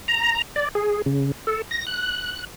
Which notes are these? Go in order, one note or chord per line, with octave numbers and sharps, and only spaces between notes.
A#5
D5
G#4
C#3
A4
A#6
F#6